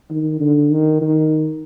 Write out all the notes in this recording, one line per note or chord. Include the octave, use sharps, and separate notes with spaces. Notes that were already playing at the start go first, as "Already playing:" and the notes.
D#3
D3
D#3
D#3